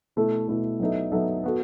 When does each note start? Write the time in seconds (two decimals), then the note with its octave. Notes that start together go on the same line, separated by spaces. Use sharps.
0.16 B2 A3 E4 A4
0.48 B2 A3 E4 A4
0.80 F#3 B3 D#4 A4 E5
1.12 F#3 B3 D#4 A4 E5
1.44 B3 F#4 A4